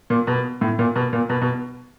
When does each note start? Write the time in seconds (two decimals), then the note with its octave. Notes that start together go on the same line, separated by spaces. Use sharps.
0.10 A#2
0.27 B2
0.61 A2
0.79 A#2
0.96 B2
1.13 A#2
1.29 B2
1.42 B2